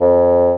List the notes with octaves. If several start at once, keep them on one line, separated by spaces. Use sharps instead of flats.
F2